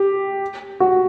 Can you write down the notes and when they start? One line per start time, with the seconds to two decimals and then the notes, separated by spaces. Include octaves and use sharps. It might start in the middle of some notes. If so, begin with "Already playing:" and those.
Already playing: G4
0.80 F#4